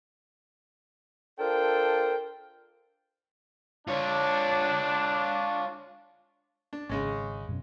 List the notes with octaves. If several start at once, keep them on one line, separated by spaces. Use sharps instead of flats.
D4 F4 A4 A#4 C5 G5
D4 F4 C#5
D4
G#1 C#3 G#3 C#4
F#2 B2 C#4